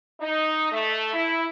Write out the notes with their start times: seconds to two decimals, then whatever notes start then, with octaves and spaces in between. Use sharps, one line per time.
0.20 D#4
0.72 A3
1.13 E4